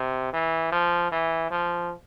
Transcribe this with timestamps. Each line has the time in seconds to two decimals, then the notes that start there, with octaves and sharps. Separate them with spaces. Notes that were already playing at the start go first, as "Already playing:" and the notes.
Already playing: C3
0.33 E3
0.72 F3
1.11 E3
1.51 F3